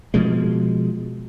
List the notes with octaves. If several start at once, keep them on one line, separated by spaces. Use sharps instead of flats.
B2 F3 G#3